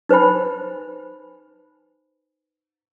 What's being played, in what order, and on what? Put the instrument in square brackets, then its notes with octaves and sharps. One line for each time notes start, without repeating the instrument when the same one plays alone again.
[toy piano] D#4 B4 C5 G#5 B5